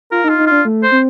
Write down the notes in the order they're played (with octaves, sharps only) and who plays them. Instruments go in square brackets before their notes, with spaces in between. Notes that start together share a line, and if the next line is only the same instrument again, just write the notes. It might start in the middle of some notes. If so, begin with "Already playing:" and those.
[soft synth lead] F4 [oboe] A#4
[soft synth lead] D#4
[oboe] F4
[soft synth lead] D#4
[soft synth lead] D4 [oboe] F4
[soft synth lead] A3
[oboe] C5
[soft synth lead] C4